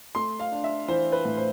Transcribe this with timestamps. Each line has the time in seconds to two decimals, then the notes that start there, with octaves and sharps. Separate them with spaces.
0.15 A3 C6
0.39 F5
0.52 D4
0.64 E5
0.88 E3 C5
1.12 B4
1.25 A2
1.37 C5